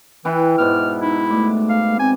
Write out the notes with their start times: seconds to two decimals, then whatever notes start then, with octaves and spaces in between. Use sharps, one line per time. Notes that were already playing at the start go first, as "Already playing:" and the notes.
0.25 E3 E4 B4 G5
0.58 G#2 B2 D5 F6
1.01 D#4 E4
1.30 A3 D5
1.69 F5
1.99 C4 G#5